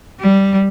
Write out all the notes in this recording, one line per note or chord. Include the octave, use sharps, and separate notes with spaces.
G3